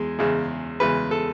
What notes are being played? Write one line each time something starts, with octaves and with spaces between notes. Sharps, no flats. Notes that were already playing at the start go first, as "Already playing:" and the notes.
Already playing: E2 G#3
E2 C#3 G#3
E2 C#3 G#3 B4
A4